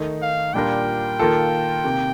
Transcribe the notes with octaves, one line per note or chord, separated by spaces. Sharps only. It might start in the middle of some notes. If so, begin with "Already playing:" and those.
Already playing: D#3 A3 D#4
F5
A#2 G3 D4 F4 A#4 G5
D#3 A#3 F4 A4
C3 D#3 A#3